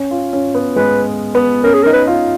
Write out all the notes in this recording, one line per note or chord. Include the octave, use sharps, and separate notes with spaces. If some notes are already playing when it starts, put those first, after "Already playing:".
Already playing: C#4
F4
C#4
B3
G#3 B4
B3
C#4 A#4
G#4
D#4 A#4
B4
F4